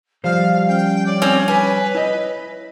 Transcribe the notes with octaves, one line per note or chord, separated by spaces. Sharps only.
F3 G3 C5 F5
C#4 G5
C#5 D5
C4 C#4
B4 G#5
E4 D#5